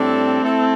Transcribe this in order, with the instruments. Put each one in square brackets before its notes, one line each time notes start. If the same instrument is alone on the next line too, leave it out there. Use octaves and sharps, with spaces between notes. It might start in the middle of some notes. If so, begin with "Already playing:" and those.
Already playing: [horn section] A2 G3 D4 A4 [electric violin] C4
[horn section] A3 E4 A4